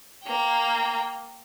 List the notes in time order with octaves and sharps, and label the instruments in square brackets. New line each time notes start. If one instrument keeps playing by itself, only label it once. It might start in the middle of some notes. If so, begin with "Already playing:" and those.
[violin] A#3 G5